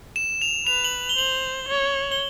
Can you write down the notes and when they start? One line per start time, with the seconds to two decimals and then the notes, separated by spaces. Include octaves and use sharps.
0.16 E7
0.42 F7
0.67 B4 F7
0.84 F#7
1.09 G7
1.18 C5 F#7
1.69 C#5
2.12 G7